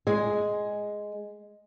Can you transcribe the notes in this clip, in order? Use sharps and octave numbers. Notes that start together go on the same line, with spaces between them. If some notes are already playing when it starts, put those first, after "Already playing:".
G#3 G#4